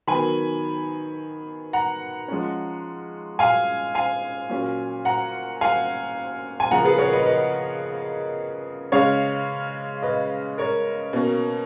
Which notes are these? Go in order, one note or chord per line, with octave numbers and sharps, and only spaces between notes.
D#3 F#3 B3 G#5 B5
F#5 A#5
F3 G#3 C#4
F5 G#5
F5 G#5
A#2 F#3 C#4
F#5 A#5
F5 G#5
G#5
C#3 F3 A#3 F#5 A#5
G#4 B4
A#4 C#5
B4 D#5
B4 D#5
C#3 G#3 C#4 C#5 F5
B4 D#5
A#4 C#5
B2 A#3 C#4